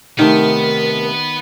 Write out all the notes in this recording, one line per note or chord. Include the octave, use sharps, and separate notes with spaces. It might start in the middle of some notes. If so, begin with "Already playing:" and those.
C3 D#3 A3 B3 A#4